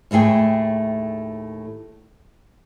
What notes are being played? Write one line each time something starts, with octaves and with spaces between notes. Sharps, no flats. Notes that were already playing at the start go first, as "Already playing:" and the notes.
D#2 A2 A3 G#4 G5